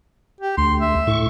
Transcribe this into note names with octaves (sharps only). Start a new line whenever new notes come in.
G4
D2 C6
E5
A2 C#6